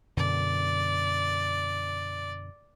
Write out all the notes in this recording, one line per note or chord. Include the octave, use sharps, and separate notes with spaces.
F#2 B2 D3 D5